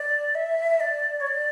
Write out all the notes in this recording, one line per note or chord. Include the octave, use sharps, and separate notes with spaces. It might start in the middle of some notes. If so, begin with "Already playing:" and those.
Already playing: D5
E5
D5
C#5
D5